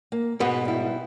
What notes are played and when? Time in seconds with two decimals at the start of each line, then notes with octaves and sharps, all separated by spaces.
0.12 A#3
0.40 G#2 B2 B4
0.65 G3 E4